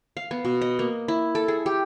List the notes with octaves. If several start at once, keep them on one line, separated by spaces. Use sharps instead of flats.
F5
B3
B2
D#5
A#3
E4
A4
G#4
G4